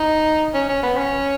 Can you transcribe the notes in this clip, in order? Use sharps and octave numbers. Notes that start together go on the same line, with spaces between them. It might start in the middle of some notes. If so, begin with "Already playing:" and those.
Already playing: D#4
C#4
C#4
B3
C#4